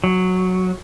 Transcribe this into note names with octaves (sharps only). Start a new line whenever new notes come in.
F#3